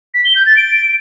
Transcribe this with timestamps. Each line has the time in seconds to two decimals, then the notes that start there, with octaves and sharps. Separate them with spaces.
0.14 B6
0.25 G7
0.36 G6
0.46 A6
0.57 D7